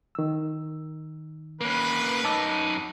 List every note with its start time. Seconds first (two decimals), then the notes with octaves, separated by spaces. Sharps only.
0.15 D#3 E6
1.61 A#3 C#4 B4
2.24 F#2 D#4 A5 D6 E6